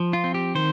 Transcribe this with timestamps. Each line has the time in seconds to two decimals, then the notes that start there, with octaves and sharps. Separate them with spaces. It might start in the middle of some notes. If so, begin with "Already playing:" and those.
Already playing: F3
0.13 F4
0.24 C4
0.34 G4
0.55 D#3 C5